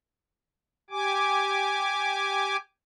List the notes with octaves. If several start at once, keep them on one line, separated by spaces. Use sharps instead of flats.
G4 G#5 D6